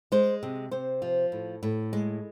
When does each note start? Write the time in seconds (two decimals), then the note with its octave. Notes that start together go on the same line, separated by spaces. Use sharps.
0.12 G#3 C5
0.43 C3
0.71 C3 C5
1.02 F3
1.32 A2
1.63 A2
1.93 G#3